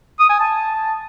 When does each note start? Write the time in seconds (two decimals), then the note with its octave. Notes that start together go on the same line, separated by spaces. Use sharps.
0.20 D#6
0.30 G#5
0.39 A5